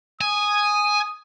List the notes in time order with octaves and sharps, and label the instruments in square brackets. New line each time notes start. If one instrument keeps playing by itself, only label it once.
[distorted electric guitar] G#5 [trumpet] D#6